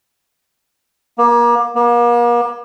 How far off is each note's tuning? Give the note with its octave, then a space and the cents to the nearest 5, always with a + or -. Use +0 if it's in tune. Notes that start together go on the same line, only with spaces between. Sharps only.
A#3 +30
A#3 +40